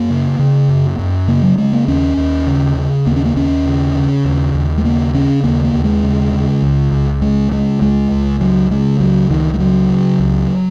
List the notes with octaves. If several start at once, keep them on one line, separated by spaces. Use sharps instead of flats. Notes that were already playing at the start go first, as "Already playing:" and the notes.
Already playing: F#2 A#3
C#3
C#3
F#2
F#2
C#3 A#3
F#3
C#3 G#3
A#3
D#2 C#4
D#2
C#3
C#3
D#2 A#3
C#4
A#3
D#2 C#4
C#3
C#3
D#2
D#2
G#3
C#3 A#3
C#3 C#4
D#2 A#3
A#3
D#2
G#3
C#3
C#3
C#2
C#2
C#3 G#3
C#3 G#3
C#2 G#3
C#2
C#3 F#3
C#3 G#3
C#2 F#3
C#2 D#3
G#3
C#3 F#3
C#3
C#2